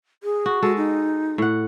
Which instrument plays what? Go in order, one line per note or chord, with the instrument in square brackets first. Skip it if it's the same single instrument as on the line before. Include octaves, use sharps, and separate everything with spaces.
[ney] G#4
[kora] F#4
[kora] G#3 A4 [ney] F#4
[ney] D#4
[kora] A2 F#5